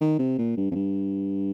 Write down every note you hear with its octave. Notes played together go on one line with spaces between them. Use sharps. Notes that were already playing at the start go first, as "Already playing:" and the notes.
D#3
C3
A#2
G2
F2
G2